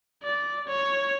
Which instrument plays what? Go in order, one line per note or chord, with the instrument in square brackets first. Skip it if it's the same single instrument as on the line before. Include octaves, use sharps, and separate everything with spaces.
[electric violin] D5
C#5